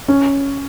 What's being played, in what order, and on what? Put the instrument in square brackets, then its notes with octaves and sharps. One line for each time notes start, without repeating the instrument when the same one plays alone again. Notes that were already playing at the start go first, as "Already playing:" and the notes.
[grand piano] C#4